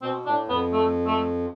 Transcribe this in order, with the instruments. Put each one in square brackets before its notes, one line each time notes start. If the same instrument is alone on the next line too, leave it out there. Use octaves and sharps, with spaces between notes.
[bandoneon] B2 [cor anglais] C4
[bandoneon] A2 [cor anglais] D4
[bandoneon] F2 [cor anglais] B3
[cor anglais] A3
A3